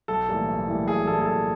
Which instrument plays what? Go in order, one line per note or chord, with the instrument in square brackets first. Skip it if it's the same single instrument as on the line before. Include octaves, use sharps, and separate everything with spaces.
[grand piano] B1 A4
A2 E3 G3 A#3
B1
A2 E3 G3 A#3
B1 G#4
A2 E3 G3 A#3 A4
G#4
B1 A4